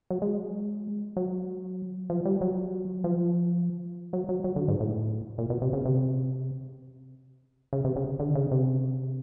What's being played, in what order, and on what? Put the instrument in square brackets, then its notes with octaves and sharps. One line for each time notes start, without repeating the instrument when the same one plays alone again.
[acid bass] F#3
G#3
F#3
F3
G3
F#3
F3
F#3
F#3
F#3
D3
G#2
A2
A#2
B2
C3
C#3
C3
C#3
C3
C#3
D3
C#3
C3